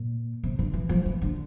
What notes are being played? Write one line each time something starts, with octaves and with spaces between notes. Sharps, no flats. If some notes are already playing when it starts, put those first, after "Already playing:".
Already playing: A#2
C3
D3
E3
F3
E3
D3